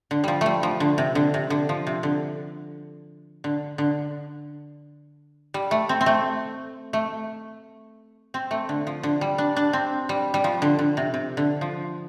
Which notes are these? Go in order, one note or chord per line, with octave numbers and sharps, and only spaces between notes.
D3
F3 G3
G3 A3
F3
D3
C3
D3
C3
D3
F3
C3
D3
D3
D3
G3
A3
C4
C4
A3
A3
C4
A3
D3
F3
D3
G3
D4
D4
C4
G3
G3
F3
D3
D3
C3
C3
D3
F3